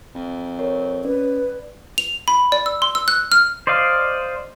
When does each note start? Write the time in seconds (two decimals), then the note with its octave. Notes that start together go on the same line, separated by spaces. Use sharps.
0.15 F2
0.59 A#4 C#5
1.05 C#4 B4 D5
1.98 F7
2.28 B5
2.52 D5
2.66 E6
2.82 C6
2.95 E6
3.08 F#6
3.32 F6
3.67 C5 D5 D#5 F5